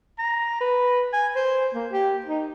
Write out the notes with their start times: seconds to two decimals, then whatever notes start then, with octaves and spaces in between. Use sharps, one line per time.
0.19 A#5
0.60 B4
1.13 G#5
1.36 C5
1.75 A#3
1.92 G4
2.26 D#4